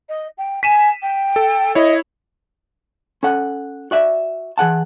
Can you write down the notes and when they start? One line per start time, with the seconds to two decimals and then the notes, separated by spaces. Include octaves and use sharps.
0.09 D#5
0.37 G5
0.63 G#5 B6 D#7 E7
1.02 G5
1.36 A4
1.75 E4 C#5 D#5
3.23 C#4 A4 F#5
3.91 F#4 D5 E5
4.58 E3 G#4 F#5 A5